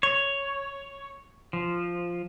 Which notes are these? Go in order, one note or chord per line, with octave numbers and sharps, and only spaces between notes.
C#5
F3